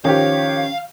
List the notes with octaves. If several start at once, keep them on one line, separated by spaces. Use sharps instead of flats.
D#3 F3 C#4 G4 C#5 F5